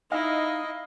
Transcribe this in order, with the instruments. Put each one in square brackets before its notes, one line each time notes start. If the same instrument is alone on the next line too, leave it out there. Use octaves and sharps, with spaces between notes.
[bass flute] D#4 [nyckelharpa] E4 [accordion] D#5 [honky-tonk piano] F5